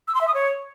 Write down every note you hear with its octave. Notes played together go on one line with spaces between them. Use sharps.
E6
C6
E5
D#6
C#5